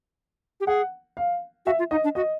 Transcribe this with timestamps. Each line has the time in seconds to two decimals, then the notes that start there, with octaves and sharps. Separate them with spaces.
0.60 G4
0.67 G#4 F#5
1.17 F5
1.66 F#4 E5
1.79 F4
1.91 D#4 D#5
2.04 D4
2.15 F#4 D#5